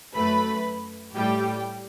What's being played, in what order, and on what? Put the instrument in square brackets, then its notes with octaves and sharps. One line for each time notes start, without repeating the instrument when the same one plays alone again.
[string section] F#2 F#3 A3 B4 B5
A2 G3 G4 G5